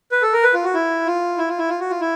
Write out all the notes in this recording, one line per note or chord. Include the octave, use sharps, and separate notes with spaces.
B4
A4
A#4
B4
F4
F#4
E4
F4
E4
F4
E4
F4
F#4
F4
E4